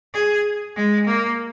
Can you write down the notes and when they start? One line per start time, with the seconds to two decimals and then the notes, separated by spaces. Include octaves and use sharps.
0.14 G#4
0.76 G#3
1.06 A#3